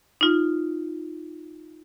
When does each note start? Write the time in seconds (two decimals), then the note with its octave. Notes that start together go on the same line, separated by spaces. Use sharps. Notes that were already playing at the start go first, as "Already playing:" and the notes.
0.21 D#4 F4